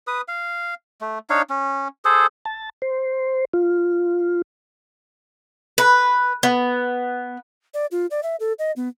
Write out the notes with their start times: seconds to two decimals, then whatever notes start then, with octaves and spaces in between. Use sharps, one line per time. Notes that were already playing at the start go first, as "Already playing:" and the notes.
0.07 B4 D#6
0.28 F5
1.01 A3
1.30 D4 D#4 C#5 F5
1.50 C#4
2.05 G#4 A4 C5
2.45 A5
2.82 C5
3.53 F4
5.78 B4
6.43 B3
7.74 D5
7.91 F4
8.11 D5
8.23 E5
8.40 A4
8.59 D#5
8.76 B3